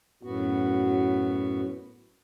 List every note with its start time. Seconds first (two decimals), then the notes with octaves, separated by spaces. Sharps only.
0.23 F#2 A2 B3 F#4